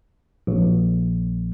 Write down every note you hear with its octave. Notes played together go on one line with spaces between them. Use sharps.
A#1